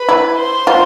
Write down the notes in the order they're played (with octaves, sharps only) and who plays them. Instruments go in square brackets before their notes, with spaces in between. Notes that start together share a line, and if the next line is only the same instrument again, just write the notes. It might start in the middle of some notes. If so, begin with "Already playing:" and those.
Already playing: [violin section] B4 B5
[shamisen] E4
[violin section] C5 C6
[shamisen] F4